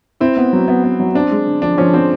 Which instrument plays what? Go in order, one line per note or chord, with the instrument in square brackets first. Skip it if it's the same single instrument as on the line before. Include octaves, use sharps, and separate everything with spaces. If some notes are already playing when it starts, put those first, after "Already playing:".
[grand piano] C4 [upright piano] E4
[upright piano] B3
F#3
B3
B3
F#3
[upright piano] C4 [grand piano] D4
[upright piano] G#3
D3
[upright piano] F3 [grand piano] D4
[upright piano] F3 [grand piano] C#4
[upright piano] F3 [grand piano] C4